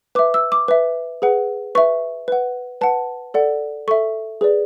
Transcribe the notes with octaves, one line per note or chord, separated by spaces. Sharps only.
B4 E5 D6
E6
D6
B4 E5
G#4 B4 F#5
B4 E5 C#6
B4 F#5
B4 F#5 A5
A4 D5 F#5
A4 E5 C#6
G#4 B4 D5